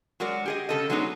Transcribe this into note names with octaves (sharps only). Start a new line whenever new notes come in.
F#3 G#3 F#4 A#4 D5
G4 G#4 D#5
C#3 A4 D#5
F#3 G#3 B3 D4 D#4 G#4